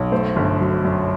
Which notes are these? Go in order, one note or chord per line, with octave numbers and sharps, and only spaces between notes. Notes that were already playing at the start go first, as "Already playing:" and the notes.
Already playing: B1
A3 C5
G1
F#3
F#2